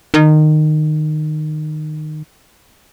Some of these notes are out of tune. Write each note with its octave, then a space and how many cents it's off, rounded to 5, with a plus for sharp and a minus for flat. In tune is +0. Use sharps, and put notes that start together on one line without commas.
D#3 -20